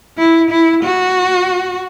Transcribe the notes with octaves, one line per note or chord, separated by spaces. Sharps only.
E4
E4
F#4